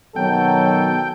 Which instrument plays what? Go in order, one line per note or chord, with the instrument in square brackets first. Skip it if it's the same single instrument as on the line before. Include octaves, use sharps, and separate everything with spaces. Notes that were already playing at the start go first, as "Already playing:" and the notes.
[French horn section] B2 D#3 F#3 [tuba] B3 [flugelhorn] A4 [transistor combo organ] G5